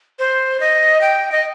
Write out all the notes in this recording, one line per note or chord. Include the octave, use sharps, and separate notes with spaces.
C5
D#5
G5
D#5